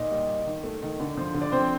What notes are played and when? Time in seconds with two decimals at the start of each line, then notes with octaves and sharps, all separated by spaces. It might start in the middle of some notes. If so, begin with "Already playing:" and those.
Already playing: A#2 D#4 D#5
0.11 G3
0.29 D#4
0.47 D#3
0.64 A3
0.82 D#3
1.00 D3
1.17 F3
1.34 D3
1.42 D5
1.52 F3 C4 C5